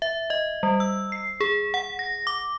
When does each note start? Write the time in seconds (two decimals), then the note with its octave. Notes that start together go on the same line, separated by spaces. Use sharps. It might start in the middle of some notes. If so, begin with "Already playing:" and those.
0.02 E5
0.30 D#5
0.63 G3
0.80 E6
1.12 C7
1.41 G#4
1.74 F#5
1.99 A#6
2.27 D6